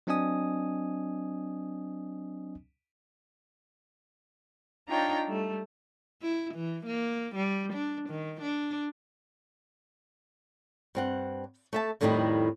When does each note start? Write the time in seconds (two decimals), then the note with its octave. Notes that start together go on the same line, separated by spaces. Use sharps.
0.07 F#3 C4 D4 D#5 G#5 D#6
4.88 D4 D#4 F4 C#5 G5 A#5
5.28 G3 A3
6.22 E4
6.54 E3
6.86 A#3
7.36 G3
7.73 D4
8.09 D#3
8.41 D4
10.95 G2 C4 F#5
11.73 A3 E5 A5
12.01 F2 A2 D#3 G3 D#4 E4